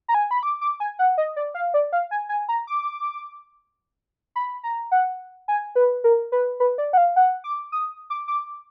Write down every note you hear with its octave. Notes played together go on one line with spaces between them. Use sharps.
A#5
G#5
B5
D6
D6
G#5
F#5
D#5
D5
F5
D5
F5
G#5
G#5
A#5
D6
B5
A#5
F#5
G#5
B4
A#4
B4
B4
D5
F#5
F5
F#5
D6
D#6
D6
D6